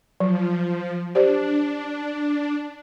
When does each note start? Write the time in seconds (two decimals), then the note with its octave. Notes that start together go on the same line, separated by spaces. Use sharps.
0.20 F3 F#3
1.15 D4 G4 C5 D5